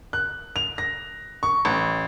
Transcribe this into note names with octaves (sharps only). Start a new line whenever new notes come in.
F#6
F7
A#6
C#6
A1